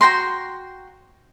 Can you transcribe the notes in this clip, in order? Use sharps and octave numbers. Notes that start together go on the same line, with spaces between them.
F#4 G5 A#5 C6